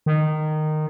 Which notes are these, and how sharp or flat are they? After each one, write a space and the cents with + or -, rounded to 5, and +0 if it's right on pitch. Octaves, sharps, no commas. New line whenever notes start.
D#3 -15